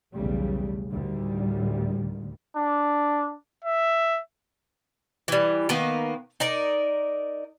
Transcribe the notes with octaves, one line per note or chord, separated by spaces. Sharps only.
B1 E2 C#3 G3 A3
D2 A2 D3 D#3 G3
D4
E5
E3 G3
D#3 A#3 B3
D#4 A#4 D5